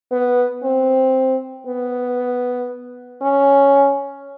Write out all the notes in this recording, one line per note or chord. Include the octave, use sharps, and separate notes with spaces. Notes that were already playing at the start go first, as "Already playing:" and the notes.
B3
C4
B3
C#4